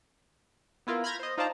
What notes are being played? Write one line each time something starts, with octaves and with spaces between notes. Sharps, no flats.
B3 E4 F4 A#4
B5 F6 G6 G#6 A#6
C5 D#5
D#4 F4 C5 D5 A5 A#5